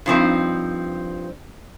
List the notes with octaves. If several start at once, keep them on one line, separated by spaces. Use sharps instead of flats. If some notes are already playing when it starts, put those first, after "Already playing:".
G2 F3 C4 D#4